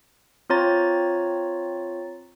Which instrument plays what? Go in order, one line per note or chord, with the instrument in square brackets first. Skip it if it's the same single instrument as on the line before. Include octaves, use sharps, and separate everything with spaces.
[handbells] C4 F4 C#5 A#5 A6